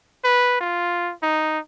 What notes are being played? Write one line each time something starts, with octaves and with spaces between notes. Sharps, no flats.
B4
F4
D#4